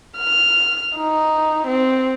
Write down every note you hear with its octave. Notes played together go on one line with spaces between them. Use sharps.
F6
D#4
C4